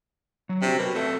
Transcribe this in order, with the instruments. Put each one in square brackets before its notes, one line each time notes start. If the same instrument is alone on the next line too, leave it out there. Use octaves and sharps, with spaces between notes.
[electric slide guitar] F#3
[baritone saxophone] C3 [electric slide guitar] D4 F#4
[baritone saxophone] B2 [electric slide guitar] A#4
[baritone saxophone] A3 [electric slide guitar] C4 F4 E5